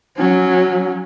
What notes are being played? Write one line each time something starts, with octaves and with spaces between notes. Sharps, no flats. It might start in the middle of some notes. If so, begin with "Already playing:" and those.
F#3 C#4